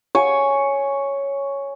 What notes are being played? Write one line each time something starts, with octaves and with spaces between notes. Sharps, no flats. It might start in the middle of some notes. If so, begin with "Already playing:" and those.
C#5 G#5